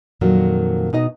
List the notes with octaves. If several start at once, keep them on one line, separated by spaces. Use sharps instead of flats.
F2 A#2 D#3 F#3
B2 D#4 D#5